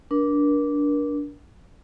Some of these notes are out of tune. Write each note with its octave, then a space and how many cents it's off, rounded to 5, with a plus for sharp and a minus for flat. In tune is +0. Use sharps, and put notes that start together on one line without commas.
D4 -15 A#4 +35